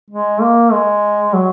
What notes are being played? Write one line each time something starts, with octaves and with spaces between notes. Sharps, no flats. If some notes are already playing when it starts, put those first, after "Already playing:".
G#3
A#3
G#3
F#3